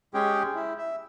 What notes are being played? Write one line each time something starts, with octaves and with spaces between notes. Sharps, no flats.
G#3 C#4 G4 G#4 G5
E4
E5